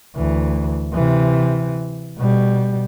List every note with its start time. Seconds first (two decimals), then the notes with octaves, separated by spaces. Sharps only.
0.16 D2 E3
0.93 C3 E3
2.17 B2 G3